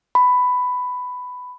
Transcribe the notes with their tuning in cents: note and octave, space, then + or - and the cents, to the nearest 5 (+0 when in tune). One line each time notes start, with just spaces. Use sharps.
B5 +10